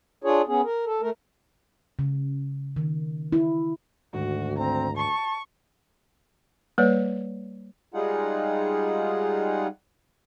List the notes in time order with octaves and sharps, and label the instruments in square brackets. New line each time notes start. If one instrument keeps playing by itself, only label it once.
[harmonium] D4 F4 G#4 C#5
B3 C#4 G#4
A#4
A4
A3 A#4
[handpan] C#3
D#3
E4
[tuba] D2 [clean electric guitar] G#2 D#3 [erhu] F#4
[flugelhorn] C4 [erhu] A#5
[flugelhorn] A5 [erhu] C#6
[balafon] G3 A#3 B4 C#5 D5
[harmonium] G3 G#3 D#4 F4 G#4 F#5